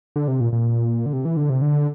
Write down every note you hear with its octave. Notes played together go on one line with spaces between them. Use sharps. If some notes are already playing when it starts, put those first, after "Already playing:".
D3
C3
A#2
A#2
D3
C3
E3
D3
C3
D3